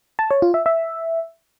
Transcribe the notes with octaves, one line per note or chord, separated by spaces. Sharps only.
A5
C#5
F4
E5
E5